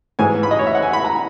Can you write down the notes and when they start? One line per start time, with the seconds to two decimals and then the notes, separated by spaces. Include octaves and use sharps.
0.19 G#2 E3 G#3 G#5
0.43 B5
0.51 D#5
0.59 C#5
0.67 E5
0.75 F#5
0.82 G#5
0.93 B5
1.05 A#5